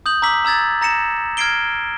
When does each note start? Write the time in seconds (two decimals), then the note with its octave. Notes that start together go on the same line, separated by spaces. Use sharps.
0.06 D#6 G6 F#7
0.22 A#5 D6 E6 B6 F#7
0.45 A#5 E6 G#6 A6
0.82 A#5 A#6 C#7 E7
1.37 F6 G#6 A#6 C7 D7 G7